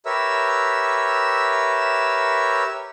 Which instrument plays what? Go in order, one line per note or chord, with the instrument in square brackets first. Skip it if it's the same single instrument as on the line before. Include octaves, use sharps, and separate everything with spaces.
[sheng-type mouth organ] G4 A#4 B4 C#5 E5 E6